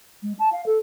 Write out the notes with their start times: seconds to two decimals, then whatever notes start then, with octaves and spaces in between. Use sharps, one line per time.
0.23 G#3
0.39 A5
0.52 F5
0.66 A4